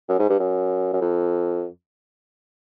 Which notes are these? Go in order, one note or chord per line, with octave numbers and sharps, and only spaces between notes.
F#2
G#2
G2
F#2
F#2
F2